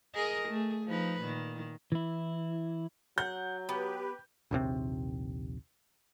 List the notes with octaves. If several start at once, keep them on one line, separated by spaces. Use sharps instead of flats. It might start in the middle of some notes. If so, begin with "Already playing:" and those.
G#4 A#4 D#5
A3 G#4
F3 D#4 B4
A#2 D#3
E3 E4
F#3 F#5 G6
B3 G4 B4
A#1 D#2 C3 C4